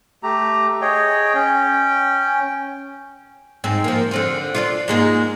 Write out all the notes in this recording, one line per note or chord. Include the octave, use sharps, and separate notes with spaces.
A3 G4 A#5
G#4 C#5 D#5 G5
C#4 G5
G#2 C4
F3 A#3
D3 C4 F4
D4 D#4 F4
G#2 G#3 A#3